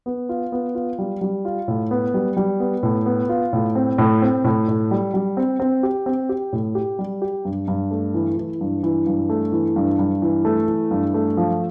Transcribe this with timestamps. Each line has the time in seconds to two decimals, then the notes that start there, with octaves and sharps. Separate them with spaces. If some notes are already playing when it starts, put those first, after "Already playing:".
0.06 B3
0.29 F4
0.52 B3
0.75 F4
0.99 G3
1.21 G3
1.45 F4
1.68 A2
1.91 B3
2.14 G3
2.37 G3
2.60 B3
2.83 A2
3.06 B3
3.29 F4
3.53 A2
3.75 C4
3.98 A2
4.22 C4
4.44 A2
4.68 A2
4.91 G3
5.14 G3
5.37 C4
5.60 C4
5.83 G4
6.06 C4
6.29 G4
6.53 A2
6.75 G4
6.99 G3
7.22 G4
7.45 G2
7.68 G2
7.91 A3
8.14 E3
8.37 E3
8.61 G2
8.83 E3
9.07 G2
9.29 A3
9.52 E3
9.76 G2
9.99 G2
10.22 E3
10.45 A3
10.68 E3
10.91 G2
11.14 A3
11.37 F3